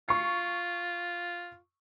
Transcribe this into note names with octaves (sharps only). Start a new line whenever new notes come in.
F4 C#6 C7